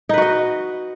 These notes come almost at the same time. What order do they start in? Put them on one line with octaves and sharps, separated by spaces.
D#4 B4 F#4 D#5